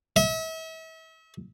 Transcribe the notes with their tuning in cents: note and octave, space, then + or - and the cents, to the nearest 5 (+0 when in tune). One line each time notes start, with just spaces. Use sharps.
E5 -40